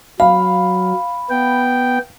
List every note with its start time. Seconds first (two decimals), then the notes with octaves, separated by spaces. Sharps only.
0.20 F#3 F5 B5
1.30 B3 G5